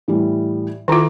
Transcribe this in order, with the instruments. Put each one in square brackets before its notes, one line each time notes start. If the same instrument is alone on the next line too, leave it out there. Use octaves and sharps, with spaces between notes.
[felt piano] A2 E3 G3
[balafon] D#3 F4 [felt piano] E4 A4 A#5